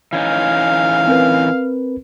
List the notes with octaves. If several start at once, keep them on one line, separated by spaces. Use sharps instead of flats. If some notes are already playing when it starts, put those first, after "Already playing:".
E3 C#4 D#4 F5
C4 A#4 B4